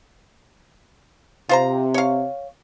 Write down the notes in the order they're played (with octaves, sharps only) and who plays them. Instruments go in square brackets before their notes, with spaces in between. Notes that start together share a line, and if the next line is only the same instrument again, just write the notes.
[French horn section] C3 [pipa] F4 C5 A#5
[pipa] C#5 F5